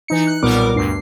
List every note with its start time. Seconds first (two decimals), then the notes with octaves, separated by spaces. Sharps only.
0.08 E3 D#4 C#7
0.27 F#6
0.43 B1 A#2 G3 B3 A#4 D6
0.74 D2 G2 C7